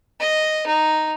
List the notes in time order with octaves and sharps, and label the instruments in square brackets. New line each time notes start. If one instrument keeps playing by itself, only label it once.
[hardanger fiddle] D#5
D#4